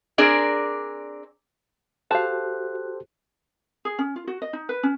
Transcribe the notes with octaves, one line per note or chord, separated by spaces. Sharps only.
C4 D4 G#4 A#4 D5
F#4 G4 A4 C5 F5 A5
G#4
C#4
F4
F#4
D#5
D#4
B4
C#4